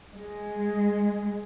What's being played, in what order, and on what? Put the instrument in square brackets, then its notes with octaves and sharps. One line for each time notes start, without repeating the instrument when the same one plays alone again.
[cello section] G#3